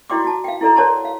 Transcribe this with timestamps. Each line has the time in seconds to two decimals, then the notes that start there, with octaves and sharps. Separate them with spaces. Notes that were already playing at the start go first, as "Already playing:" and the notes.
0.10 E4 F#4 D5 G5 C6 D6
0.24 F#4 A5
0.44 F5 G5
0.61 E4 A4 D5 A#5
0.76 A#4 C#5 D5 F#5 A5 C6
1.05 F5